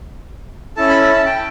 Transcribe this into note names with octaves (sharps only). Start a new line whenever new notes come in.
C#4 E4 A4 A5
B5
B5
A5
G5